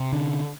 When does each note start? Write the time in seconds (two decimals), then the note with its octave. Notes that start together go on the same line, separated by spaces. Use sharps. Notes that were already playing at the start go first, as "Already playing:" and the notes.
Already playing: C3
0.13 D3